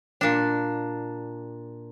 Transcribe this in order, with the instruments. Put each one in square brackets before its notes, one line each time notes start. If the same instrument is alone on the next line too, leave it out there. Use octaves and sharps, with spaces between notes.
[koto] A#2 D4